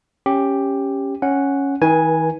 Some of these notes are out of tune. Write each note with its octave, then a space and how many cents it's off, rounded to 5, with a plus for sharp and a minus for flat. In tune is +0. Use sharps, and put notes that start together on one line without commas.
C#4 -5 G4 +5
C#4 +0 F#5 +0
D#3 +45 B4 -30 G#5 +0